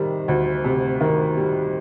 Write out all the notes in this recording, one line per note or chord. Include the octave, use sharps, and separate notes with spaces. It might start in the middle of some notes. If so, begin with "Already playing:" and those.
Already playing: C3 D#3 G3
D2
C3
D#3
G3